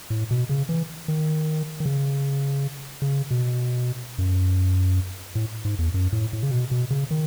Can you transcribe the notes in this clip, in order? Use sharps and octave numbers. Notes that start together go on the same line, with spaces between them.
A2
B2
C#3
E3
D#3
D#3
C#3
C#3
B2
F#2
A2
G#2
E2
F#2
A2
A2
C#3
B2
B2
C#3
D#3